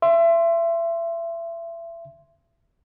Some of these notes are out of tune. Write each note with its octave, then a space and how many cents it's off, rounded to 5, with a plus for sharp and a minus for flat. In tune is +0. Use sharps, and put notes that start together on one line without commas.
E5 +30 C6 +0